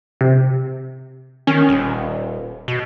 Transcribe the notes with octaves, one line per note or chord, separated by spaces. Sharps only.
C3
D#3 C#4
D#1
B2